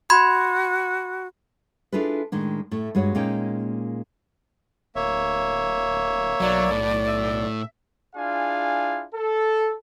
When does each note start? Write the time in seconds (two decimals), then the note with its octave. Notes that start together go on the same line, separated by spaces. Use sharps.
0.10 F#4 B5 C6 G#6
1.92 D4 E4 F4 G#4 A4 B4
2.32 A2 D#3 G#3 D4
2.71 A2 A3
2.95 G2 G#3 F#4 C#5
3.15 A#2 G#3 A#3 C#4 D#4 G5
4.96 D1 A#3 C#5 E5
6.41 B1 F#3 D5
6.71 A2 A4
7.07 E5
8.15 D4 E4 F4 G#4 F5 G#5
9.15 A4